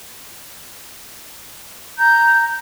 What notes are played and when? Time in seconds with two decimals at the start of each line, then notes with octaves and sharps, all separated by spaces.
1.98 A#5 G6